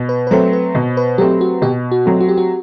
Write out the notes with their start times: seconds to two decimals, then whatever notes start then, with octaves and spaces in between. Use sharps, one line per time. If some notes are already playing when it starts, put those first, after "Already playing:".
Already playing: B2
0.09 B4
0.27 B4
0.31 F#3 A3 C4 C5
0.53 B4
0.75 B2
0.97 B4
1.18 F#3 A3 C4 G4
1.41 F#4
1.62 B2 G4
1.92 F#4
2.06 F#3 A3 C4
2.21 F#4
2.29 G4
2.38 F#4